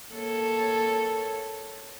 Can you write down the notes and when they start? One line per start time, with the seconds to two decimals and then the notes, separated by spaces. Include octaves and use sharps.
0.14 A#3 A4 C#5